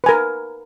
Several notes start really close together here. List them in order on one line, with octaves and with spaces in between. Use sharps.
B4 G#5 A#4